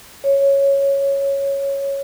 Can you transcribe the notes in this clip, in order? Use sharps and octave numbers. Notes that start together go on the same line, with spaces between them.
C#5